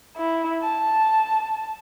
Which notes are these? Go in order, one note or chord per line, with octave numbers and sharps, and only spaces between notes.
E4
A5